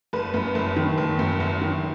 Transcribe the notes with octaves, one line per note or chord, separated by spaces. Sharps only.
F#1 B4
F#2
F#1
D#3
F#1
F#2
F#1
D#3